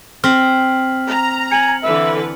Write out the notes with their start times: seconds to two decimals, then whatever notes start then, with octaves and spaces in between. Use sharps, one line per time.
0.24 C4 F6 B6 F#7
1.08 A#5
1.52 G#5 C#7 F#7
1.83 D3 E3 B4 E5